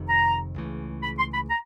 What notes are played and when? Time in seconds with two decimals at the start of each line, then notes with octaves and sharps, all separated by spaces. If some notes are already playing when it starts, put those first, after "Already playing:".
Already playing: F1 F2 C3 D#3
0.08 A#5
0.56 C#2 C#3 E3 A3
1.03 B5
1.19 C6
1.34 B5
1.50 A#5